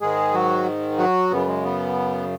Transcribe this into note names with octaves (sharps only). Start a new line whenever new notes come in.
G#2 D#3 G#3 G#4
F#3 F#4
F#3 F#4
F#2 C#3 B3
G#3
B3